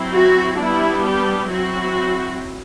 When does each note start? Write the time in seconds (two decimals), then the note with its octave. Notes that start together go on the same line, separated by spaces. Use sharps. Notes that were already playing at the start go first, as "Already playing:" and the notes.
Already playing: F#3 C4 E4
0.15 F#4
0.60 G3 B3 D4 E4
1.05 G4
1.50 F#3 C4 E4 F#4